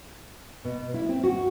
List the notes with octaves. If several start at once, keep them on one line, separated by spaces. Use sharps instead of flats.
B2
E4
C4
F#4